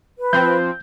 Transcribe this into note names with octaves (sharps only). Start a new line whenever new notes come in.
B4
F3 C4 G6